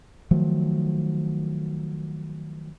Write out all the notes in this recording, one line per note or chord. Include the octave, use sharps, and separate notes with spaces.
D#3 F3 F#3 A3